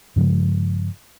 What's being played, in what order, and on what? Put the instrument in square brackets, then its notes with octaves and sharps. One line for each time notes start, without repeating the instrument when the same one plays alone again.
[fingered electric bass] G2 C#3 F3 G#3